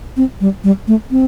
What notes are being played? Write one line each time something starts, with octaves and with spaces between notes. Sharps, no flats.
C4
G3
G3
A3
C4